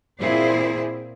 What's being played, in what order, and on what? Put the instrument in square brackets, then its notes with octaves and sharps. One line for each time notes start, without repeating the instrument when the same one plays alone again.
[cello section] A#2 C4 E4 G#4 C5